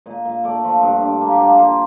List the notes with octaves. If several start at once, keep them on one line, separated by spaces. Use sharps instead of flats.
A#2 D#5
A#2 F5
A3 D5
F3
G2
D4
A#3
G4
F3 F4
D#4
D3 F4